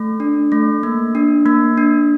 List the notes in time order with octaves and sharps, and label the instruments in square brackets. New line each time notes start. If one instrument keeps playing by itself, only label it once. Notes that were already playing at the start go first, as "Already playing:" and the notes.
Already playing: [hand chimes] A3
D4
A3
A#3
D4
A#3
D4